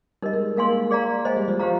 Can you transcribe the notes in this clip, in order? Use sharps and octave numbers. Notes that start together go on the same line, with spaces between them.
G3 D#4 A#4 D#5
G#3
A#3 A#4 F5 G#5 C6
G#4 D5 F5 A#5
G#3 C5 D#5 G#5
G3
F3
F3 G4 C5 F5 A#5